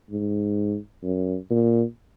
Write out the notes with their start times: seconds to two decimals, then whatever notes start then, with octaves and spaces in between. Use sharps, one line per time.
0.11 G#2
1.04 F#2
1.50 A#2